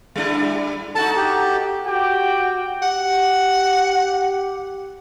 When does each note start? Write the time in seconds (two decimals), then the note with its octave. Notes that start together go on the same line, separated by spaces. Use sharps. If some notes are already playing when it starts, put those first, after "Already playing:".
0.16 G3 D4 E4
0.95 D#4 F#4 A4 A5
1.16 G4
1.87 F#4 G4 G5
2.82 G4 F#5